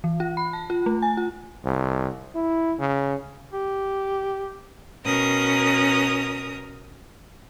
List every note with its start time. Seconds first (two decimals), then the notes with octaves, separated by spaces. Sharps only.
0.04 E3
0.20 F4
0.37 B5
0.53 A5
0.70 F4
0.86 A3
1.02 G#5
1.17 F4
1.64 C2
2.35 E4
2.79 C#3
3.53 G4
5.05 B2 C#4 A#4 A#5 D#6